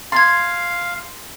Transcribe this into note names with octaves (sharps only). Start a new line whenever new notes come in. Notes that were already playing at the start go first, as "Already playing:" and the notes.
F5 C6 G#6 A6